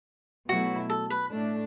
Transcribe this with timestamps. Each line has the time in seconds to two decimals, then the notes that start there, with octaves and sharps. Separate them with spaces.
0.49 B2 F#3 A3 E4 F#4
0.90 A4
1.10 B4
1.31 A2 A3 D4